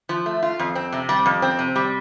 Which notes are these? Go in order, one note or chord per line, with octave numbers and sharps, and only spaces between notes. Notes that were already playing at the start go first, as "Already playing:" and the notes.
F3
A3
F4
F2
C4
C3
G3
F2
C4
C3
G3